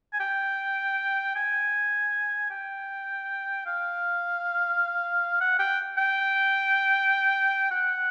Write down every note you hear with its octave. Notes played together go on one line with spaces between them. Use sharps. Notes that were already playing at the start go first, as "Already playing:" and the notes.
G#5
G5
G#5
G5
F5
F#5
G5
G5
F#5